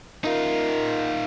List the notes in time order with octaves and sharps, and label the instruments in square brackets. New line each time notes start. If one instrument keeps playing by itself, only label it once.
[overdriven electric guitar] D#4 F4 [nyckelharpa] A#4